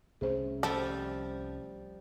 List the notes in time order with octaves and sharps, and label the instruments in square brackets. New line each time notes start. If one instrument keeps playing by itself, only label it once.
[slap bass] C2 A3 C#4 [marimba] G#4 C5
[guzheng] F3 G3 [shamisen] A4